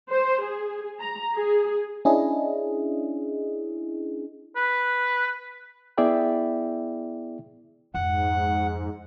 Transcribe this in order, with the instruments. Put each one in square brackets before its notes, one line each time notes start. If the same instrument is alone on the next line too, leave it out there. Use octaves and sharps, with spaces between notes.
[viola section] C5
G#4
A#5
G#4
[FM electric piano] C#4 D4 E4 G#4 D#5
[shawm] B4
[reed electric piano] B3 E4 G#4 D5 E5 G5
[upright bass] F2 [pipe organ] G#2 [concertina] F#5